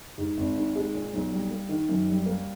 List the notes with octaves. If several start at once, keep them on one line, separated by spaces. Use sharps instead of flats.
G#2
G#1
D#3
G#3
A#2
B1
G3
A#3
D#3
F#2
G3
A#3